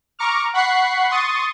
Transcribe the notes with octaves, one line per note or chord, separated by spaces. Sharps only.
A#5 C#6 D6 F6
F#5 B5 C#6 F#6 C7
C6 C#6 D#6 A6